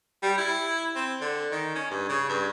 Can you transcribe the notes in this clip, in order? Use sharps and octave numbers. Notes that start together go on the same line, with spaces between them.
G3
E4
C4
D3
D#3
C#4
G2
C#3
G2